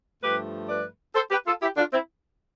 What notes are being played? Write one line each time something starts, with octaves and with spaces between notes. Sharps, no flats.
G2 F3 A3 G4 B4
B4 D5
A4 C5
G4 B4
F4 A4
E4 G4
D4 F4
C4 E4